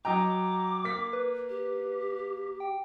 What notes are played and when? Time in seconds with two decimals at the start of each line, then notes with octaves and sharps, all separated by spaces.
0.05 F#3 D#5 G5 A#5 D6
0.85 A#3 B6
1.13 B4
1.49 G4
2.60 G5